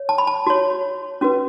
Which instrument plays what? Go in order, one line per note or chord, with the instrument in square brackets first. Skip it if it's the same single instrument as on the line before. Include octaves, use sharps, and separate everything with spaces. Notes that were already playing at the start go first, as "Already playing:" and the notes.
Already playing: [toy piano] C#5
A5
B5
A5
F#4 C#5
C#4 F#4 B4